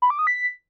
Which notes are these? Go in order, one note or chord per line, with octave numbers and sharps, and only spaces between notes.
B5
D6
D#6
B6